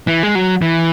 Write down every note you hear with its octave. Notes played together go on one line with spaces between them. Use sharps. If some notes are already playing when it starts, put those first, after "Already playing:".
E3
G#3
F#3
E3